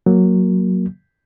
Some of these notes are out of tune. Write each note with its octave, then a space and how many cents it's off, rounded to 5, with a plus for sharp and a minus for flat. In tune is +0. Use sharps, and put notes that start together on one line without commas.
F#3 +0 A#3 +0